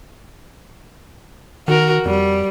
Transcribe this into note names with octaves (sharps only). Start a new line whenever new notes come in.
D#3 F#4 A#4
F2 G3